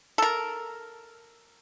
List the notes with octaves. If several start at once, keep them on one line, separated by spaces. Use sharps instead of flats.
A4 A#4